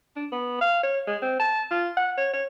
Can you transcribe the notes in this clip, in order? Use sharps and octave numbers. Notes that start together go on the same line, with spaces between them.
D4
B3
F5
C#5
G#3
C4
A5
F4
F#5
C#5
C#5